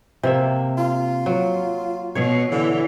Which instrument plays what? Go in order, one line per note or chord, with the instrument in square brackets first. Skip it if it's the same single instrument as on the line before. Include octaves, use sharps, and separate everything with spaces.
[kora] C3 A#3 E5
[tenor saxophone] F4
[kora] F#3
[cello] B2 [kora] C#5
[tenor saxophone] D3 [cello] E3